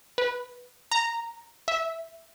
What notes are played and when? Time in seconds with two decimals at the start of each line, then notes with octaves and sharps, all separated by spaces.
0.18 B4
0.91 A#5
1.68 E5